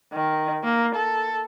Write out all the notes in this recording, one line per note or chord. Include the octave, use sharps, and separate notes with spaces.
D#3
A#3
A4